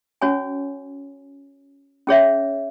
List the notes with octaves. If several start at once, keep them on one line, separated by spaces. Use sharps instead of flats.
C#4 F#4 C#5 G#5 C#6
C#4 G#4 C#5 E5